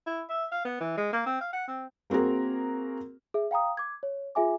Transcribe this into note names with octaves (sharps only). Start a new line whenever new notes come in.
E4
E5
F5
B3
E3
G#3
A#3
C4
F5
F#5
C4
A#3 C4 F#4 G#4 A#4
G#4 E5
F5 G5 A#5 D#6
D6 G#6
C#5
F4 G#4 E5 G#5 D6